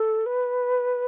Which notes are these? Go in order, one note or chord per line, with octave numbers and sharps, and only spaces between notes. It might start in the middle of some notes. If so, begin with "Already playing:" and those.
Already playing: A4
B4